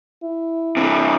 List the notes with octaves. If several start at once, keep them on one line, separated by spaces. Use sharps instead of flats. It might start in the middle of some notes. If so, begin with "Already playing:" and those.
E4
C3 E3